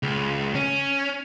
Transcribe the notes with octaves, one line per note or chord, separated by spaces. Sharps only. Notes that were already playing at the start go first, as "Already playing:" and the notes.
C#2
C#4